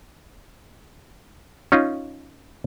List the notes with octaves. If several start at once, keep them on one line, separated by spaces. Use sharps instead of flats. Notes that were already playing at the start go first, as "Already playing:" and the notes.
C#4 D#4 F4